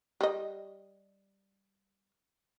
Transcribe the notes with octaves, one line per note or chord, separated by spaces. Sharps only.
G3 D#5